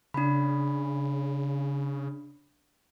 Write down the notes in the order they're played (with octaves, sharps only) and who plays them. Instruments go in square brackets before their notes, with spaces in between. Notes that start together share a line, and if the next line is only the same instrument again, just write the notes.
[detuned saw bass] C#3 [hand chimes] D4 B5